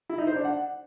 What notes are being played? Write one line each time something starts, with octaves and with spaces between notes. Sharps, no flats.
E4
D#4
C5
D4
F#5